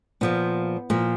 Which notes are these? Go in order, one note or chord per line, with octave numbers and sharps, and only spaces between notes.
A#2 F3 A#3 B3
A#2 F3 A#3